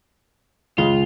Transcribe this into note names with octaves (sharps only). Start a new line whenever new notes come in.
C#2 C#3 G#3 F4